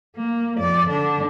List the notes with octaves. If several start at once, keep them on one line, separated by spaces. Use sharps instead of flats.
A#3
F2 D5
D3 D4